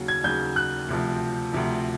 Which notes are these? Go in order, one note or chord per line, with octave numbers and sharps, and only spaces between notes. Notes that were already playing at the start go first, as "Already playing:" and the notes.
Already playing: D#2 C#3 F#3
G#6
D#2 C#3 F#3 G6
F#6
D2 C3 F3
D2 C3 F3